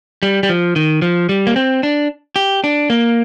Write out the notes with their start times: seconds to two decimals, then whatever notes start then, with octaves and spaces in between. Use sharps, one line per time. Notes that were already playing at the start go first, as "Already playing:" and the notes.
0.23 G3
0.43 G3
0.49 F3
0.76 D#3
1.02 F3
1.29 G3
1.47 A#3
1.56 C4
1.83 D4
2.36 G4
2.64 D4
2.90 A#3